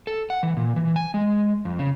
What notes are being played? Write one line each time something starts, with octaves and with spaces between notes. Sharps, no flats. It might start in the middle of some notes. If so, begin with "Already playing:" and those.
A4
F#5
E3
A#2
E3
G#5
G#3
F2
C#3